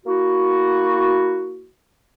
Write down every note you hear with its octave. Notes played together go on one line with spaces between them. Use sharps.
A#3 E4 F#4